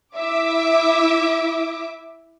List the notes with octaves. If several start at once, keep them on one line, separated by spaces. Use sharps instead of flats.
E4 E5 D6